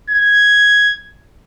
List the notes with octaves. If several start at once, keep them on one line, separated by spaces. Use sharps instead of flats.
G#6